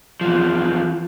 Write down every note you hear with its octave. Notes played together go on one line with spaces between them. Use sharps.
E2 F3